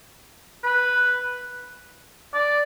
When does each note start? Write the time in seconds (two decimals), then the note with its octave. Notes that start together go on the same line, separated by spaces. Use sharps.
0.64 B4
2.34 D5